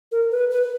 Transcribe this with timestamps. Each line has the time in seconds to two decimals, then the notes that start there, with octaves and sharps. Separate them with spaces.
0.12 A#4
0.31 B4
0.51 B4